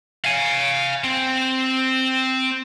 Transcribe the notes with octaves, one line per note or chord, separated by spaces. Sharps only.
F5 G#5
C4